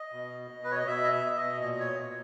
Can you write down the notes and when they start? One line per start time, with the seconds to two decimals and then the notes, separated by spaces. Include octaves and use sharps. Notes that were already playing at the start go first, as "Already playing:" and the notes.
Already playing: D#5
0.12 B2
0.50 B2
0.64 B4
0.71 C#5
0.79 D#5
0.87 B2 E5
1.04 D#5
1.12 E5
1.24 B2
1.36 D#5
1.60 A#2 D#5
1.72 D#5
1.80 C#5
1.98 A#2